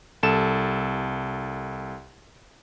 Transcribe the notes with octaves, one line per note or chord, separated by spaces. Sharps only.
C2 A4 E7